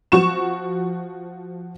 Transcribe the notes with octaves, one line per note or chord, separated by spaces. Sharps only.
F3 F#4 C#6 E7